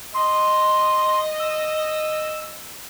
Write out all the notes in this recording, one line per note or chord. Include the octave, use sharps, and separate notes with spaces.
D#5 C6
E6